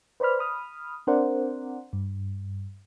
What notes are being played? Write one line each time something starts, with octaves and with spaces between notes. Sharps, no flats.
B4 C5 D5 B5 F6
B5 D#6 F6
C4 D4 A#4 C5 D5 F#5
G2